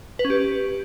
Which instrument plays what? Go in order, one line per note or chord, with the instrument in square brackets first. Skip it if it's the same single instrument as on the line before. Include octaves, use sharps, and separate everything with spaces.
[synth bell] B4
C#4
G4